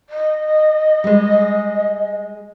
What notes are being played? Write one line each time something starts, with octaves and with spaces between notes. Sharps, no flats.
D#5
G3 G#3